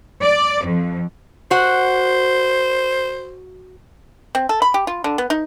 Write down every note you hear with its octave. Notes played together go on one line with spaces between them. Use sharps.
D5
F2
F#4 C5 F#5
C4
A4
B5
G4
F4
D3
B3
D#4